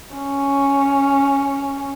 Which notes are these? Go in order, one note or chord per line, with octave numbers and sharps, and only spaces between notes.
C#4